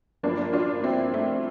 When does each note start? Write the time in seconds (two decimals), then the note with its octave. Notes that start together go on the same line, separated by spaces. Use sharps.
0.23 G1 G2 F3 A#3 D4
0.53 D4 F4
0.83 C4 E4
1.14 A3 C4